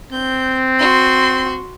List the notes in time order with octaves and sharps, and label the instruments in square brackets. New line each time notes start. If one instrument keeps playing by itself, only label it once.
[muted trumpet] C4 [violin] G6
[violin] F#4 C6